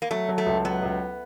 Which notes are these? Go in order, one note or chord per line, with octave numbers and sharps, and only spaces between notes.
A#3
F#3 A3
F#3
A3
C#2
F#3 B3
C#2